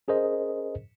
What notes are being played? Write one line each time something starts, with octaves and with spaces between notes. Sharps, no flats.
C#4 G#4 A#4 C5 D#5